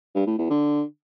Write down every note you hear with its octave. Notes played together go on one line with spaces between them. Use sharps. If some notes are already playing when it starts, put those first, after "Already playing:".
G2
A2
E2
D3